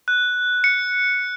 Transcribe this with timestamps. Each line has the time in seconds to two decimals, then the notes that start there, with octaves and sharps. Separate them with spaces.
0.08 F#6
0.64 C#7